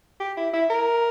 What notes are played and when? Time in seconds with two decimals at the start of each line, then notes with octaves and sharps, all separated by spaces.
0.20 G4
0.37 E4
0.54 E4
0.70 A#4